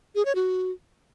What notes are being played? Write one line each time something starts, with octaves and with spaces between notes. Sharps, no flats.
G#4
C#5
F#4